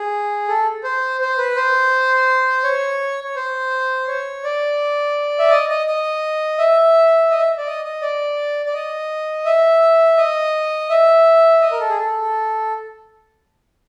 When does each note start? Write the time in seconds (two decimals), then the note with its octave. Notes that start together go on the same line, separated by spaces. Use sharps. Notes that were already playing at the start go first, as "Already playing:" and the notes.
Already playing: G#4
0.48 A4
0.84 C5
1.21 C5
1.38 B4
1.56 C5
2.64 C#5
3.24 C#5
3.36 C5
4.08 C#5
4.44 D5
5.39 E5
5.50 D#5
5.69 D#5
5.87 D#5
6.58 E5
7.30 D#5
7.39 E5
7.58 D5
7.67 D#5
7.84 D#5
8.02 D5
8.66 D5
8.74 D#5
9.45 E5
10.17 D#5
10.90 E5
11.61 D#5
11.72 A#4
11.80 A4
11.89 G#4
11.97 A4